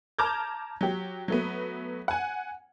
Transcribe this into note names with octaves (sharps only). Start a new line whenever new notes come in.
A5 A#5 D6 F6 G6 G#6
F#3 G4
F#3 A3 B3
F#5 G#5